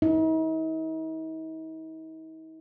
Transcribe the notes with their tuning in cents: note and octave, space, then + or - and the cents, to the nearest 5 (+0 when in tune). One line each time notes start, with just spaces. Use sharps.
D#4 +45